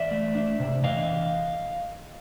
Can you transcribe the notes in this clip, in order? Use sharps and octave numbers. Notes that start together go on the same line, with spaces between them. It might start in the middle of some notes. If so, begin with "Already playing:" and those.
Already playing: E3 D5 E5
A3
D4
C3
E3 D#5 F5